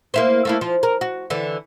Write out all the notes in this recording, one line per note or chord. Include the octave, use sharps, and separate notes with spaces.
A#3 E4 C5
A3 A#3 E4
F3
A#4
F#4
D3 E3